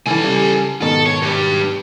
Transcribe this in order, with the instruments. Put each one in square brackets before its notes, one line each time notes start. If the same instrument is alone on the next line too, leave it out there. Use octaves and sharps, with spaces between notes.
[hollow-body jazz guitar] C2 E3 [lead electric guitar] A4 G#5
[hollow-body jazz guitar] C#3 G3
[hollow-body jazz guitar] G#2 B2 D#3 [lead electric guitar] A4
[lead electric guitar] C#5
G2 G3